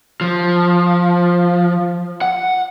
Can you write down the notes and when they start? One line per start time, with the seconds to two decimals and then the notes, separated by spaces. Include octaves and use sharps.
0.21 F3
2.22 F#5